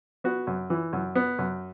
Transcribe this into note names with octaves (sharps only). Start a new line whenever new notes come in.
B3 F#4
F#2
E3
F#2
B3
F#2